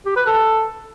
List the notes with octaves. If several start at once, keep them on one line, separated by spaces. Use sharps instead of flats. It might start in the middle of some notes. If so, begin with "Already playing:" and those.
G4
B4
A4